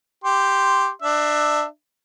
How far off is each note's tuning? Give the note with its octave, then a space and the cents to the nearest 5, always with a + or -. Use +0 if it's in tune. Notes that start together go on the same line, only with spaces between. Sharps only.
G4 +0 C6 -5
D4 +25 E5 +0